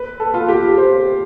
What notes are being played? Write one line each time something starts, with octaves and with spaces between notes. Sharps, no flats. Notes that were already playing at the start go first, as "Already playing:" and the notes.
Already playing: B4
A4
F4
G4
C5